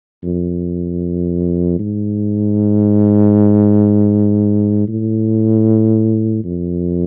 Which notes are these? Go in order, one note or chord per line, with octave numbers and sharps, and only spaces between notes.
F2
G#2
A2
F2